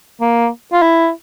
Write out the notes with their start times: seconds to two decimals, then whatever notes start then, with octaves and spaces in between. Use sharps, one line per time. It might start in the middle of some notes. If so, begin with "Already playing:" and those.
0.21 A#3
0.73 F4
0.82 E4